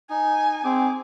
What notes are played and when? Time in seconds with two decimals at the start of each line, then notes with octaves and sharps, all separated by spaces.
0.10 D#4 G#5
0.65 C4 G#4 D6